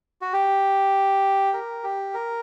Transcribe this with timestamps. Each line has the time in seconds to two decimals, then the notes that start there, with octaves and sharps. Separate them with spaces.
0.22 F#4
0.33 G4
1.54 A#4
1.84 G4
2.14 A#4